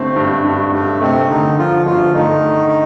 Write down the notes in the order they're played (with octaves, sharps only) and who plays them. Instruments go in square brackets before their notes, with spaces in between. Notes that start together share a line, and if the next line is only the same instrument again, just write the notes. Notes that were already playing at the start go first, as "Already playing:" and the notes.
Already playing: [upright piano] G2 D3 C4 [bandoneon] A3
[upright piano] G2
G2
[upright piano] G2 [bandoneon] A3
[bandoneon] C3 C4 [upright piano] A3
[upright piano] D3 [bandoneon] D#3 D#4
[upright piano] D3 [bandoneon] F3 F4
[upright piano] G1 [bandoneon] F3 F4
[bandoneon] D#3 D#4 [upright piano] A3
[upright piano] D3